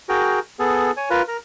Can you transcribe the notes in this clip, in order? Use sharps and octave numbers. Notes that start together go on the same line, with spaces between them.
F#4 G#4 A#4 G5
B3 G#4 A4
C#5 G#5
F4 A#4 B4
A#4